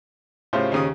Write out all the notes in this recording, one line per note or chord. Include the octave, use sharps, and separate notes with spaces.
A2 C#3 F4 G4 C5
D#2 C#3 D#6